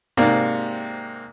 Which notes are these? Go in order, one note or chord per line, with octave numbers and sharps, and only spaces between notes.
G#2 C3 A#3 D5